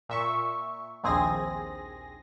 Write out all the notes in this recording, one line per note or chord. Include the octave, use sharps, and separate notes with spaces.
A#2 E5 C#6
A#1 D#2 C4 G#4 G#5 A#6